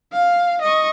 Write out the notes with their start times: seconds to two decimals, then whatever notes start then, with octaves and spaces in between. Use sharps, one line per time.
0.12 F5
0.61 D#5 C#6